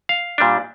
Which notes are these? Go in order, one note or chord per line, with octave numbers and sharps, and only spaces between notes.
F5
A#2 G3 D4